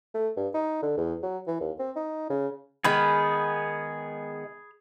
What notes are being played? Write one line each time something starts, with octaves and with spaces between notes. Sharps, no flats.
A3
G2
D#4
D3
E2
F#3
E3
D#2
C4
D#4
C#3
D#3 G#3 B3 G#4 B5 F6